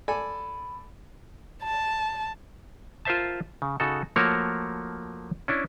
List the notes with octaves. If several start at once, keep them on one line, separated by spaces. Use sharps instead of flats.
A4 D5 G#5 B5
A5
F4 A#4 C5 E5 A5
C#3
C#3 D#4 F#4 A4
F3 A3 A#3 F#4 A#4 C#5
C#4 D4 E4